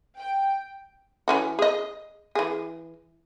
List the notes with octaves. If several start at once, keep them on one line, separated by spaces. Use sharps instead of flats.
G5
E3 C#4 F#4
G#4 D#5
E3 G#4